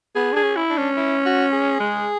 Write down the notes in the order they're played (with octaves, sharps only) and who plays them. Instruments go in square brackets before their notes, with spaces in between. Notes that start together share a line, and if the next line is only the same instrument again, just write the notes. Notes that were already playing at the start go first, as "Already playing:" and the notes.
[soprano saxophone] B3 [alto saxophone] G#4
[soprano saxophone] D4 [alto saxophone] G#4
[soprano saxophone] C#4
[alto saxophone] E4
[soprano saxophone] D4
[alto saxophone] C#4
[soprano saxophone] E4
F#4
G#4
[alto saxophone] G#3